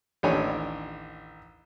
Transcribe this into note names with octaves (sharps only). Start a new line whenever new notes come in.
A1 D#2 D4 C#5 G#5